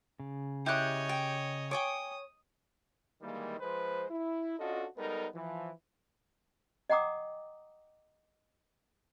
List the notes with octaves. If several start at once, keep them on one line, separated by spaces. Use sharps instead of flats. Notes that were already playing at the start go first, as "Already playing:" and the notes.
C#3
E4 G4 C#5 D#5 D6 F#6
G5
C#5 G5 G#5 D6 D#6
D#3 E3 G3 G#3 A#3
F3 G#3 B4 C5
E4
C#4 D4 F4 F#4 A4 D#5
G3 G#3 B3 D#4 A4 A#4
E3 F3
D#5 F#5 G5 A#5 D6 D#6